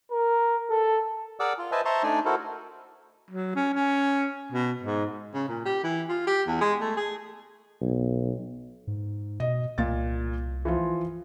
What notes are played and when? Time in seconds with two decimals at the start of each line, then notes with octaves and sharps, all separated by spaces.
0.12 A#4
0.70 A4
1.40 G#4 A#4 D5 F#5 D6 E6
1.58 F4
1.72 B4 C5 D#5 E5 G#5 A5
1.85 C5 E5 A5 A#5 C6 C#6
2.03 A3 D4 D#4 D5 G#5
2.25 E4 F#4 A4 A#4 C5
3.31 F#3
3.56 C#4
3.74 C#4
4.52 B2
4.83 G#2
5.34 C#3
5.48 A#2
5.65 G4
5.84 E3
6.09 F4
6.27 G4
6.47 E2
6.61 G#3
6.81 A3
6.97 G#4
7.81 B1
8.87 G#2
9.40 B2 D#5
9.78 C2 A#2 A6
10.65 E3 F3 F4